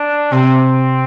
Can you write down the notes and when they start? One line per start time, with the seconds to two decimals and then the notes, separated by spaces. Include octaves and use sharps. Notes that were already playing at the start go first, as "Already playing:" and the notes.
Already playing: D4
0.32 C3 C4